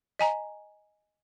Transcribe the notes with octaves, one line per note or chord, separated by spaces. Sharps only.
D#5 G#5 A#5